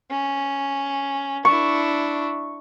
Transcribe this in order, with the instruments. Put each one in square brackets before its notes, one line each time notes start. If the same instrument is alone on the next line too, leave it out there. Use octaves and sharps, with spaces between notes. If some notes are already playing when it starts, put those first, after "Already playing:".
[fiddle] C#4
[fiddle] D4 E4 [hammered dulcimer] C#6